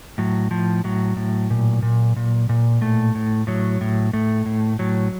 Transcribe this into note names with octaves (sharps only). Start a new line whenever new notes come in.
A2 F#3
A2 F3
A2 F#3
A2
A#2
A#2
A#2
A#2
A2 A3
A2
A2 F#3
A2
A2 A3
A2
A2 F#3